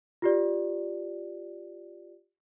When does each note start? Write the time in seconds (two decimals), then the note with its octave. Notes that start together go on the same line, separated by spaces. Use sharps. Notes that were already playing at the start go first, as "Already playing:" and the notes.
0.22 F4 G4 D5